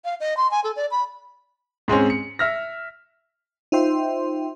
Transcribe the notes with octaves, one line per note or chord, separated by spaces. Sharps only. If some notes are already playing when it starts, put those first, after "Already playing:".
F5
D#5
C6
G#5
A4
D5
B5
G#2 G#3 C4 C#4
C#7
E5 F6 A#6
D#4 F4 C5 E5 G5 C6